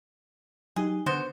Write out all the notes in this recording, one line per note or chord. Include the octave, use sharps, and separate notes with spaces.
F#3 D#4 G4 G#4
D3 B3 F#4 C5